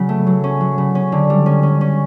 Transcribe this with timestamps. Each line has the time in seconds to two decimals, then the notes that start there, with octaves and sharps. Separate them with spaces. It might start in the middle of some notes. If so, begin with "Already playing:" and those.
Already playing: C#3 F#3
0.09 A3
0.27 F#3
0.44 C#4
0.61 F#3
0.78 C#3
0.95 C#4
1.12 D3
1.30 G3
1.46 C#4
1.63 C#4
1.81 C#4